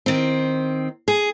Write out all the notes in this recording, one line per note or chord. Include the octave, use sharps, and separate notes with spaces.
D#3 C4
G#4